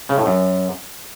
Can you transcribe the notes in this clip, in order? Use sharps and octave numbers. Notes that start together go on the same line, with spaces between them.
C#3
A2
F#2